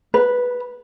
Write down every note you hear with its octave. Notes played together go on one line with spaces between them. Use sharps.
B4